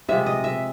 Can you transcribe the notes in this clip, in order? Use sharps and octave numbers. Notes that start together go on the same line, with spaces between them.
C3 F3 G#3 E5
D#5
E5